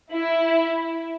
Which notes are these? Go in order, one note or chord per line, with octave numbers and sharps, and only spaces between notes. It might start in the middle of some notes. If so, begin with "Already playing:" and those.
E4